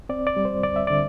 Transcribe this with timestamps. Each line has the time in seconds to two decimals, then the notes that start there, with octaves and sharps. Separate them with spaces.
0.09 C4 D5
0.27 D5
0.36 G3
0.45 C5
0.63 D2 D5
0.76 E5
0.87 D3 D5